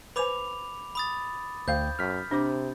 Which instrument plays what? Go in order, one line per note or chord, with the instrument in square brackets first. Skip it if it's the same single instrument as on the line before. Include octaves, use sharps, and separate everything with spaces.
[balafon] B4 C5 G#5 [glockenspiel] B5 D6 F7
[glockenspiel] B5 D#6 A6
[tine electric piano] D2 G5 [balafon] C5 F5 [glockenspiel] G6
[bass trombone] F#2 [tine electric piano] F6 B6
[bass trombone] C3 [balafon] D4 C5 D6